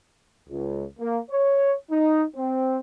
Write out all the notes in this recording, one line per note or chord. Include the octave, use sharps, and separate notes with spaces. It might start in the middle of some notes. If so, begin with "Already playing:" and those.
C#2
A#3
C#5
D#4
C4